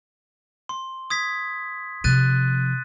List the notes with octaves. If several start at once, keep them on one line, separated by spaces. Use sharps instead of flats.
C6
D#6 G#6 B6
C3 F3 F#6 A6 D#7